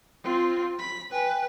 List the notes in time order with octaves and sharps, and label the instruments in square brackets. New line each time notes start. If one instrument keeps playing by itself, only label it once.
[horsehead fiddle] C4 F4
B5
[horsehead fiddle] B4 [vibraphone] G5 G#5